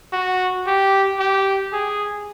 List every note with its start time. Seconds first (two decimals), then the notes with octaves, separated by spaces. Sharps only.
0.13 F#4
0.67 G4
1.19 G4
1.73 G#4